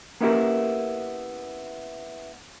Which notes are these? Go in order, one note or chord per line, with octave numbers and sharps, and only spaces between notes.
A#3 B3 C#4 E4 G4 A#4